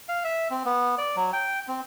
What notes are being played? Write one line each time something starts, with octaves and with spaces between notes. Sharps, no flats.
F5
E5
C4
B3
D5
F#3
G5
C4